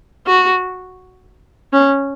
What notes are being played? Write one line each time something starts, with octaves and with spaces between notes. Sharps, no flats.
F#4
C#4